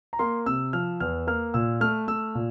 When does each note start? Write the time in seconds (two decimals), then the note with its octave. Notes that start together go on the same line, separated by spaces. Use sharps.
0.13 A#5
0.19 A#3 C6
0.46 C3 E6
0.73 F3 F6
1.00 E2 F6
1.27 A#3 F6
1.54 A#2 E6
1.81 A3 F6
2.08 A3 E6
2.35 A#2